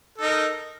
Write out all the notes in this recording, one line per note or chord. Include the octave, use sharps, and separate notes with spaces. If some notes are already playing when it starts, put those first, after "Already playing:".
D#4 A4 A#4